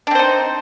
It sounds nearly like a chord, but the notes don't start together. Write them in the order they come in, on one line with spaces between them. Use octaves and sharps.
D4 C4 C5 D#4